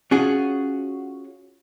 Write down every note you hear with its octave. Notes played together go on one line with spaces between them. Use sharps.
C#4 F4 F#4 G#4